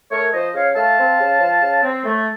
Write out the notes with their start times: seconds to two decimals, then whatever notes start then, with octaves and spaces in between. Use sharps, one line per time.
0.11 A3 A#4 C#5
0.33 F3 C5 D#5
0.54 C#3 C#5 F5
0.75 A3 F5 A5
0.97 C4
1.19 C#3
1.41 F3
1.62 C#3
1.83 C4
2.05 A3